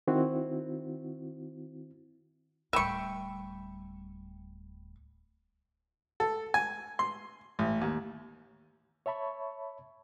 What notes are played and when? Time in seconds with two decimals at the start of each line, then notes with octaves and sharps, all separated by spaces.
0.07 D#3 C4 E4 F#4
2.73 D1 G3 E5 G5 B5 C#6
6.20 A4
6.54 G#5
6.99 C6
7.59 A1
7.81 D#2
9.06 C#5 E5 A5 B5 C#6